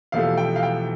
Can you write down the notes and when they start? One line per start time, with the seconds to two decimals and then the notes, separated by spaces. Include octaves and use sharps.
0.12 E1 E2 C3 F3 A3 F5
0.38 G5
0.56 F5
0.63 G5